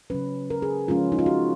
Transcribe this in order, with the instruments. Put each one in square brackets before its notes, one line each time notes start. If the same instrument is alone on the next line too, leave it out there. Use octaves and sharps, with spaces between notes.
[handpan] C#3 F#3 C#4 B4
A#4
G#4
C#3 F3 G#3 C#4 F4
D#4
F4
F#4